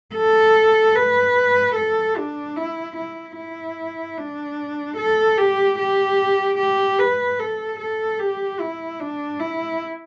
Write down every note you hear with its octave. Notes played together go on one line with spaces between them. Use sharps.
A4
B4
A4
D4
E4
E4
E4
D4
A4
G4
G4
G4
B4
A4
A4
G4
E4
D4
E4